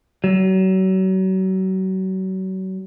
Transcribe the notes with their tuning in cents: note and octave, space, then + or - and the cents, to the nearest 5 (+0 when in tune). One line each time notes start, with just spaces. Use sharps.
F#3 +35